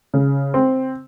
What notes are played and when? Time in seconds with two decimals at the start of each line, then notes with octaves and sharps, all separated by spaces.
0.14 C#3
0.54 C4